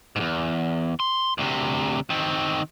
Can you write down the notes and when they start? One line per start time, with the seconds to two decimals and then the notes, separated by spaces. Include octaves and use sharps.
0.16 E2 G#2
1.00 C6
1.38 D2 C3
2.10 D#3 C4